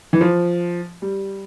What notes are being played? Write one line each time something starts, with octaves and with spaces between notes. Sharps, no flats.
E3
F3
G3